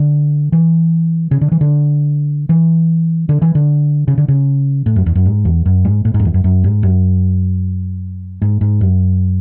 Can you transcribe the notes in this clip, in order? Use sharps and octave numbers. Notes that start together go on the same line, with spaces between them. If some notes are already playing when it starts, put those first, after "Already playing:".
Already playing: D3
E3
C#3
D3
E3
D3
E3
D3
E3
D3
C#3
D3
C#3
A2
F#2
E2
F#2
G#2
E2
F#2
G#2
A2
G#2
F#2
E2
F#2
F#2
G#2
F#2
G#2
G#2
F#2